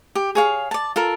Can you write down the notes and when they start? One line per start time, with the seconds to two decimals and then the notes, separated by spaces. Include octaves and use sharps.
0.15 G4
0.35 G#4 C#5 F5
0.71 D5 A5
0.96 F4 A4 A#4